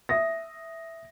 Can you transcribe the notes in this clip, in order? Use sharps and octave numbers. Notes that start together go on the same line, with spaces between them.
E5 D#6 A#6